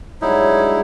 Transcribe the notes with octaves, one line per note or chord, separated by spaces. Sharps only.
G2 F#3 G#3 D#4 E4 C#5